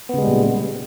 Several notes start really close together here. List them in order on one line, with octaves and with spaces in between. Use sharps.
B3 C#3 G#3 G3 A#2